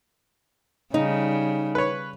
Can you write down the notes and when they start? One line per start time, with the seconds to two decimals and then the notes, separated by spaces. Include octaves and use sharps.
0.94 C#3 G3 D#4
1.75 B4 C#5